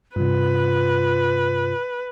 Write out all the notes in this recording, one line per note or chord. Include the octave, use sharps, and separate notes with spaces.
G2 C3 F4 B4